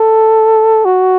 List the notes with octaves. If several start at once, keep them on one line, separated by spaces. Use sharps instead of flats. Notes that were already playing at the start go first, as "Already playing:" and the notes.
Already playing: A4
F#4